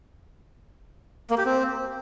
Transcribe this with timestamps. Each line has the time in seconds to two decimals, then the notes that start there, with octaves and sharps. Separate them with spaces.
1.30 A#3
1.38 G4
1.45 C4